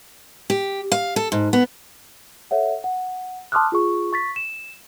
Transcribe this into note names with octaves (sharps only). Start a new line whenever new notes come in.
G4
F5
A4
G#2
B3
A4 C#5 E5 F#5
F#5
A5 C6 D6 D#6 F6 F#6
F4 G#4 C#6
C#6 A6 B6
E7